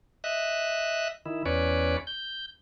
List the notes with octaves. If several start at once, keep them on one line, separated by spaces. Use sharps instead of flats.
D#5 E5 F#6
D#3 E4
E2 C#4 B4 C#5 D5
G6